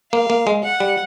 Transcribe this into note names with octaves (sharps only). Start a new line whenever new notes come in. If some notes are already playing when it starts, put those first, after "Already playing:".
A#3 F5
A#3
G#3
F#5
G3